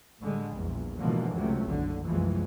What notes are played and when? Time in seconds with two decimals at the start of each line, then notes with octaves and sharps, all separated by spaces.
0.21 A2 D3 G3 G#3
0.55 A#1 E2
0.98 G#2 B2 D3 E3 F3 A#3
1.34 C#2 C3 F#3 A3
1.67 F#1 B1 D3
2.06 F#1 C2 E3 F3 G#3